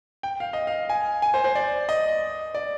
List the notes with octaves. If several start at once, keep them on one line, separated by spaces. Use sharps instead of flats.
G5
F5
D#5
F5
G#5
G#5
C5
C5
D5
D#5
D5